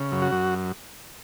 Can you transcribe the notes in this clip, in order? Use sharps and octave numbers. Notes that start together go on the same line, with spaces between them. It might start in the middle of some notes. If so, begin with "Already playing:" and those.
Already playing: C#3
F#2
F#4
F#2